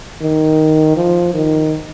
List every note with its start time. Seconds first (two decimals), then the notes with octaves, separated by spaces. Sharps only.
0.21 D#3
0.96 F3
1.34 D#3